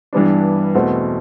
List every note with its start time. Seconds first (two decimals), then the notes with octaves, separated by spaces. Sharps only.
0.13 G2 E3 G3 B3 D4
0.75 E2 B2 A3 C4